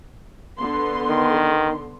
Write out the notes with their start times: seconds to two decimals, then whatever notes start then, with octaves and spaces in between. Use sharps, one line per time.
0.58 D3 B3 C6
1.10 D#3